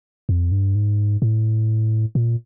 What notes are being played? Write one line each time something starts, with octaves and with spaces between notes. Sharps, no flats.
F2
G2
G#2
A2
A#2